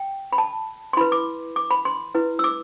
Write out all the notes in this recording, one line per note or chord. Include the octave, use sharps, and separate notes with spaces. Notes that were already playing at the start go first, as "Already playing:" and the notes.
Already playing: G5
B5
A5
C6
E4 B4 B5
D6
D6
B5
C6
E4 B4
E6
D6